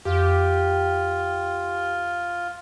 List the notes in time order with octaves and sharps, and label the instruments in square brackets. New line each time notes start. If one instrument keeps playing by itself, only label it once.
[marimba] F2 [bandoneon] F4 [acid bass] G4